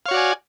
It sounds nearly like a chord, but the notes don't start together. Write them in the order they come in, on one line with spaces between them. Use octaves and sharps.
F5 C#5 F#4 D5 G#5